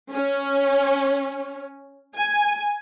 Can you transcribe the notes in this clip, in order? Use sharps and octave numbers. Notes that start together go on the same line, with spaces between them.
C#4
G#5